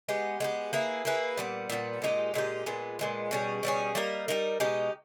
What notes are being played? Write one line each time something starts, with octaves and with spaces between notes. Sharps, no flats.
G#3 B3 G4
G#3 B3 G4
A#3 E4 G#4 B4
A#3 E4 G#4 B4
A#2 G3 B3
A#2 G3 B3
A#2 G#3 D#4 G4
A#2 G#3 D#4 G4
A#2 G#3 B3
A#2 G#3 B3
B2 G3 C#4 G#4
B2 G3 C#4 G#4
G3 A#3 D#4 A#4
G3 A#3 D#4 A#4
B2 G#3 D#4 G4